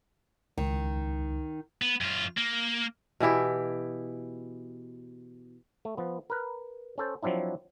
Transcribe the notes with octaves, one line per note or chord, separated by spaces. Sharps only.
C#2 D#3
B3
F#2 F4
A#3
B2 E3 E4 G4
A3
F3 B3
A#4 B4
C#4 A4 C5
F3 F#3 C4 D4 E4